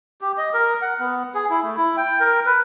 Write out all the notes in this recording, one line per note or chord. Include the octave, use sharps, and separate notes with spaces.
G4
D#5
A#4
F#5
B3
G#4
E4
A3
E4
G5
A#4
B4